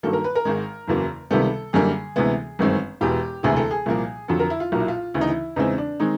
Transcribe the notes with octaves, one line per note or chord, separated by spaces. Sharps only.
G2 D#3 F#3 A#3 A4
A#4
B4
A#4
G#1 G#2 D#3 G#3
F#1 E2 C#3 F#3 A#3
C#2 C3 D#3 G3 B3 A4
F#2 D3 G3 A#3 G#4
D2 C3 E3 G#3 B3
G1 F#2 D#3 G#3 C4
E1 E2 B2 G4
E1 D2 C3 E3 G#4
A4
G#4
C2 A#2 F3 A#3
F2 D3 F#3 A4
A#4
E4
F4
B1 A#2 F#3 A#3 F4
E4
F4
D2 C#3 E3 E4
D#4
E4
E2 C#3 E3 G#3 C4 D#4
D4
D#3 G#3 C4 D#4